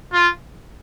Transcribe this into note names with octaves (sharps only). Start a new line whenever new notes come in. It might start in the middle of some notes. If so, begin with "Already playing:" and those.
F4